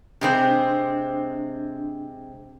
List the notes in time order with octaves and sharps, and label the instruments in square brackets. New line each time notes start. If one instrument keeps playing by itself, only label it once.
[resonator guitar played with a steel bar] C3 G#3 C4 [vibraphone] D4